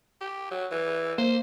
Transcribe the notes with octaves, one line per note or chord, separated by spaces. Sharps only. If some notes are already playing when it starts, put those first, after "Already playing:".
G4
F#3
E3
A#3 C5